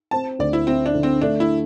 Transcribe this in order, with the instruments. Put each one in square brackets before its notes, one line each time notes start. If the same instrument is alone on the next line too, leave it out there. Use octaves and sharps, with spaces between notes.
[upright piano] C4 [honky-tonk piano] A5
[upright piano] D2 [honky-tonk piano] D5
[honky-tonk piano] E4
[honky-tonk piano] C4 [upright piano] E4
[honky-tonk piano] D4
[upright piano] D3
[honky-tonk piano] C4
[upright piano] A3 [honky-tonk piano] D4
[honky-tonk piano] E4